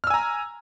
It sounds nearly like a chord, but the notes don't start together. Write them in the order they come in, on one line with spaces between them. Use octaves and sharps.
F6 E6 G#5 A#5